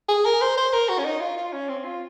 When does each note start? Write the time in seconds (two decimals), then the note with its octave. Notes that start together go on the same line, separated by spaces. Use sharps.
0.09 G#4
0.26 A#4
0.41 C5
0.57 C5
0.73 A#4
0.89 F#4
0.99 C#4
1.05 D#4
1.21 F4
1.37 F4
1.53 C#4
1.69 C4
1.85 F4